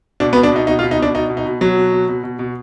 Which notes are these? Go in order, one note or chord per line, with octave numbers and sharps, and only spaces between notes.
B2 D4
B3
B2
D4
B2 D#4
B2 D#4
F4
B2
D#4
B2 D4
B2 D#4
B2
D#4
B2
B2 F#3
B2
B2
B2
B2
B2